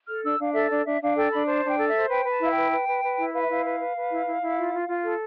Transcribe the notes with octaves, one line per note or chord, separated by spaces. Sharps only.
A4 F6
D4 E6
D4 F5
A4 E5
D4 D5
D4 E5
D4 F5
A4 G5
D4 B5
C5 A5
D4
G5
A4
E5
C5
B4 G5
B4
A5
E4 F5
G5
B4
B4
B4
B4
E4
B4 F5
E5
E4 F5
B4
B4
B4
E4
E4
E4
F4
F4
F4
A4